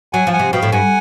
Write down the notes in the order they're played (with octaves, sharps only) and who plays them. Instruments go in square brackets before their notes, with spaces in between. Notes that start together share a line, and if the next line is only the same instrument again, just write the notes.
[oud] F#3 [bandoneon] F#5 G#5
[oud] F3
[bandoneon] F#5 G#5
[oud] C3
[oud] B2 [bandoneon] F5 G5
[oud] A2
[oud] G2 [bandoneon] F#5 G#5